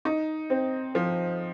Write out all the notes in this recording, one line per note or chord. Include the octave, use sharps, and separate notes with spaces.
D#4
C4
F3